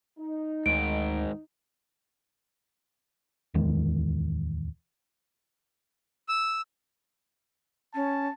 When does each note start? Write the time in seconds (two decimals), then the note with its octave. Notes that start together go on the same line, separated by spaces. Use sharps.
0.19 D#4
0.66 D2 G#2 D#3 D7
3.54 D1 E2 D#3 G#3
6.29 E6
7.94 C#4 A5